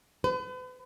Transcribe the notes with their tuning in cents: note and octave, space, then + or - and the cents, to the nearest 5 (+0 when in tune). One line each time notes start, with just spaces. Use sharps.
B4 +40